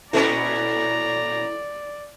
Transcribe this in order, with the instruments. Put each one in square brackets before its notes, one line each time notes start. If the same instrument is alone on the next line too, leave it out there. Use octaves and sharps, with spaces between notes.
[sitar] A#2 B3 C#4 [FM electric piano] E4 A4 [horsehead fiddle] D5 [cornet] A#5